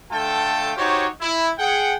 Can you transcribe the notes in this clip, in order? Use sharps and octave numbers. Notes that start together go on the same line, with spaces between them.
D3 A3 F4 A4 G5 A5
D#4 F#4 G4 C5 C#5
E4
G#4 F#5 G5